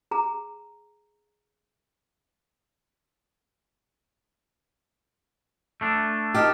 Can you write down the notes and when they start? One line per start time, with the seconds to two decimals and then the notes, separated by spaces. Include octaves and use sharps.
0.11 G#4 A#5
5.81 A3 D4
6.34 D#4 G4 A#4 A5